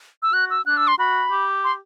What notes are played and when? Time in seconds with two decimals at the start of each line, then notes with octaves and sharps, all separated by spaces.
0.22 E6
0.33 F#4 F#6
0.50 E6
0.66 D4 F#6
0.77 E6
0.87 C6
0.99 F#4 B5
1.31 G4
1.64 C6